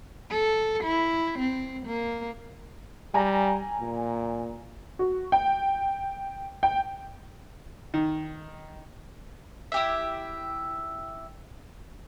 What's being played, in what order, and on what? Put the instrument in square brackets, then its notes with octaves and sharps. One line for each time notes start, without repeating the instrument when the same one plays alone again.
[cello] A4
E4
C4
A#3
[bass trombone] G3 [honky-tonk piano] G#5 A#5 A#6
[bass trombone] A#2
[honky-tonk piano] F#4
G5
G5
[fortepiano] D#3
[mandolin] E4 G4 E5